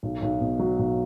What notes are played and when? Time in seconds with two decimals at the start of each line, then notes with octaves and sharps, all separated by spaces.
0.03 B1
0.22 B1
0.41 B2
0.59 F#3
0.79 B1